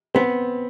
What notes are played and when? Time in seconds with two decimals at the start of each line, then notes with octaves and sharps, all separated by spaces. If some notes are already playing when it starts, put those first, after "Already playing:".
0.15 B3 C4